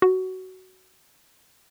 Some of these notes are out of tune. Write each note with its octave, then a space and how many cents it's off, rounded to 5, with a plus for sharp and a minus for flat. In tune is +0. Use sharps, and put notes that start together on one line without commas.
F#4 +15